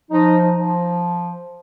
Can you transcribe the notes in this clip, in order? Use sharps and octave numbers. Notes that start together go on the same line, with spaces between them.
F3 D#4
F3